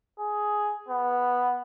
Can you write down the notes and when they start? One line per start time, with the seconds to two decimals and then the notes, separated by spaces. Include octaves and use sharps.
0.19 G#4
0.89 B3